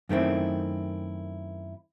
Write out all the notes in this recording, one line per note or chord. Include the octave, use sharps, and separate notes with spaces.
F#2 D#3 A3 C4 E4